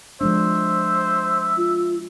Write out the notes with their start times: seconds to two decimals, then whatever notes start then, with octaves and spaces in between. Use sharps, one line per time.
0.21 F3 G#3 D4 C5 E5
1.57 F4